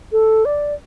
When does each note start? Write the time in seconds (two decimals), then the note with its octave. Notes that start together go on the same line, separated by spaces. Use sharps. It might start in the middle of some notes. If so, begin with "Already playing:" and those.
0.12 A4
0.45 D5